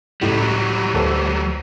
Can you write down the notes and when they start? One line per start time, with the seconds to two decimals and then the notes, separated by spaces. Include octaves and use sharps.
0.21 C#2 A2 F#3 G3
0.94 D2 A4 B4 C5